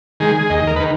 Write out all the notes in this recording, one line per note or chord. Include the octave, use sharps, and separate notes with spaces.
D#3 G#3 G#4
D#2 D#5
A#4
B4
D#3